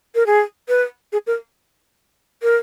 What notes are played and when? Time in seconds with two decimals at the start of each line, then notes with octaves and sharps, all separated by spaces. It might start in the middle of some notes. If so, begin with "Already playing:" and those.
0.15 A#4
0.26 G#4
0.69 B4
1.13 G#4
1.27 A#4
2.43 A#4